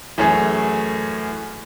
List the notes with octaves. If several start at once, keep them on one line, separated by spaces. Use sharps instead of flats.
F#2 E3 A3 C#4 G#4